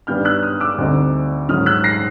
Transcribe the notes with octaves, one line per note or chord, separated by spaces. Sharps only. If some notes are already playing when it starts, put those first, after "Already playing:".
G2 D#3 G3 B3 D4 F6 G6
E6 F#6
D#6 F6
D6 E6
D2 D3 G3 C4 D#4
G#2 D#3 F#3 D#6 F6
E6 F#6
A#6 C7